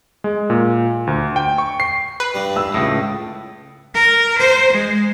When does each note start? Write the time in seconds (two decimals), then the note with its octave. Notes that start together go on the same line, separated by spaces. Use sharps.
0.24 G#3
0.50 A#2
1.07 D2
1.36 G5
1.58 C#6
1.80 C7
2.20 B4
2.34 G2 G3
2.56 E6
2.74 C#2 A2 D#6
3.95 A#4
4.38 C5
4.72 G#3